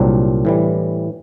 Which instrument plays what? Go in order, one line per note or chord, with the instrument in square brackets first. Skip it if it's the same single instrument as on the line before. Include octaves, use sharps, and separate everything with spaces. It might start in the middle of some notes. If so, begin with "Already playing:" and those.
Already playing: [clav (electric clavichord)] C2 A#2 F#3 C4 D4
A2 E3 G3